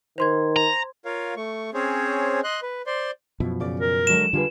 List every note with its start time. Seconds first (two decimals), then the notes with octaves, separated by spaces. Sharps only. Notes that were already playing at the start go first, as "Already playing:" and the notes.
0.18 D#3 C5 C6 G#6
0.56 A#5
1.05 F4 A#4 C#5 F5
1.36 A3 C#6
1.74 C4 C#4 G#4 C5 C#5
2.44 D#5 C6 F#6
2.62 B4
2.86 C5 D5 C6
3.40 F#2 B2 F3 E4
3.60 C#3 D5
3.80 A#4
4.07 D3 F#3 G#3 E7
4.33 D3 G3 F4 G#4 B4